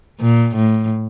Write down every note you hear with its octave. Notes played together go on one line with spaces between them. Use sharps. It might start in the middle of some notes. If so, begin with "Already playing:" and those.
A#2
A2